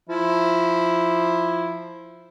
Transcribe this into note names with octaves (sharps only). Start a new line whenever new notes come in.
F3 E4